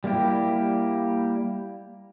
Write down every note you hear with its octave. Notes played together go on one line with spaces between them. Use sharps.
G3 A#3 E4 G4